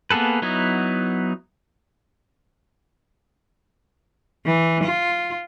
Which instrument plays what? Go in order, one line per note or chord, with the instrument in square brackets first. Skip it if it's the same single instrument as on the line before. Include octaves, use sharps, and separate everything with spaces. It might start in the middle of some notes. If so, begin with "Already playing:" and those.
[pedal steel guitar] A#3 B3 G#4 A4 B4
F#3 B3 D#4 E4
[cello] E3
F4